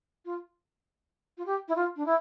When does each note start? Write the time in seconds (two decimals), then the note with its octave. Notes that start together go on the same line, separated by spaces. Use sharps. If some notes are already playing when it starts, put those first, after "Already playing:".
0.25 F4
1.38 F4
1.46 G4
1.68 E4
1.76 F4
1.96 D4
2.06 E4